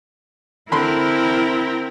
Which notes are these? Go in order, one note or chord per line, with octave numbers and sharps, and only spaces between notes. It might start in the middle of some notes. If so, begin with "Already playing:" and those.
D3 C4 E4 A#4 B5 C6